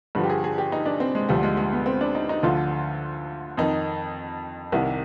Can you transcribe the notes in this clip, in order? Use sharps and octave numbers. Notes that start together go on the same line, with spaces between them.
G2 D3 F3 B4
G4
G#4
G#4
G4
D#4
D4
C4
G#3
D2 D3 F3 G3
G#3
G#3
B3
C4
D4
D#4
D#4
D2 D3 F3 F4
F2 D#3 D#4
C2 C3 D#3